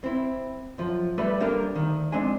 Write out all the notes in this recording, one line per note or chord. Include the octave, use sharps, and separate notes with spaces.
C4 E4
F#2 F3
G3 A3 A4 B4
G3 A#3 D4 G4 A4 A#4
D2 D#3
F2 G#3 C4 D4 G#5